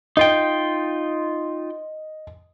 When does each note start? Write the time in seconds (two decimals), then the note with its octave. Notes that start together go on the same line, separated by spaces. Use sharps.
0.17 D#4 F4 D#5 G5